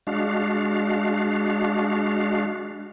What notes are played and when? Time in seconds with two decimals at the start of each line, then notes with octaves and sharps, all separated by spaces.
0.07 G#3 D4 F#4 F5